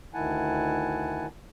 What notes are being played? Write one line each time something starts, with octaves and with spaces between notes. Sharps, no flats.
D2 D#3 E4 F#5 G#5 A5